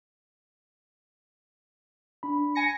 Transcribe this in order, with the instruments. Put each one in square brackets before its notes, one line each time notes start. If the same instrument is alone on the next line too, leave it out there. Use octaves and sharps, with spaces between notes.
[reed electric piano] D4 B5
[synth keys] G#5 A#6 C#7